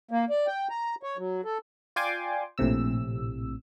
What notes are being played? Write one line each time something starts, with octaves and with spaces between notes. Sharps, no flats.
A#3
D5
G5
A#5
C#5
F#3
A4
F4 D5 G5 G#5 C6 D6
A#1 A2 C3 E6